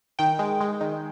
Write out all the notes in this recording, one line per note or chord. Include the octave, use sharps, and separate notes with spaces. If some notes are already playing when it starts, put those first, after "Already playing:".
D#3 G5
G#3
G#3
D#3